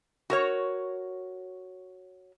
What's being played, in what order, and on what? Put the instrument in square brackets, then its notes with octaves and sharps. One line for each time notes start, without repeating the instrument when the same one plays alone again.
[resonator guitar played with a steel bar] F#4 A#4 C#5